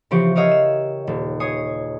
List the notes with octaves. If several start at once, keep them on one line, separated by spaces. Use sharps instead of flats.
C#3 E3 F3 C4 G4 C#6
G4 A#4 C#5 D#5 F5 E6
E7
D#1
C#5 G#5 D#6 C7